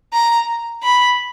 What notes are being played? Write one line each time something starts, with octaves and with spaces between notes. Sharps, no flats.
A#5
B5